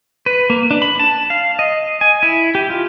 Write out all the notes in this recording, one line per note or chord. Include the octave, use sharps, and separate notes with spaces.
B4
A#3
D4
B5
A5
F5
D#5
G#5
E4
G4
F4